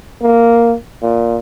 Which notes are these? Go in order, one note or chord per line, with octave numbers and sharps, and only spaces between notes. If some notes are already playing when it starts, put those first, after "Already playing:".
A#3
A#2